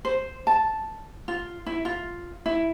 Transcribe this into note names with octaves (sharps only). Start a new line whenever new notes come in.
C5
A5
F4
E4
F4
E4